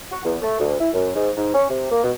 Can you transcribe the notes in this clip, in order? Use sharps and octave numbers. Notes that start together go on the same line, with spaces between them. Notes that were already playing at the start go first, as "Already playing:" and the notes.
F#4
E2
A3
D2
E4
F#2
G#2
G#2
C#4
C3
A#3
B2